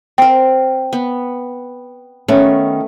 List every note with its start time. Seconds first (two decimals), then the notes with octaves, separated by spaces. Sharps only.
0.18 C4 A#4 G5
0.93 B3
2.28 D#3 A3 B3 C#4